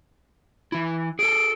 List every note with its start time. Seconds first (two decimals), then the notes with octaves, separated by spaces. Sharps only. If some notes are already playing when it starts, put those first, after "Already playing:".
0.72 E3 E4
1.19 G#4 A4 D7